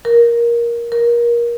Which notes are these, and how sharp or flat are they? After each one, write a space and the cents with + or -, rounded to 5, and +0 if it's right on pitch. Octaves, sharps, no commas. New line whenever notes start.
A#4 +15
A#4 +25